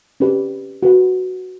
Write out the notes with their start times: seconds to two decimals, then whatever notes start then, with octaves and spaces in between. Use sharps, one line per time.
0.20 C#4 G4 B4 D5
0.83 F#4 B4 F#5